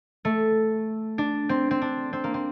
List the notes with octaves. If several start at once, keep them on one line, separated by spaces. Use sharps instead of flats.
A3
D4
C4
C4
D4
C4
A#3
C4